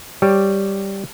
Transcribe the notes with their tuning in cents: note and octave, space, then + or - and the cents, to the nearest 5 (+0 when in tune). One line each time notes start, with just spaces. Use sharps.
G3 +0 G4 +0 C#5 +0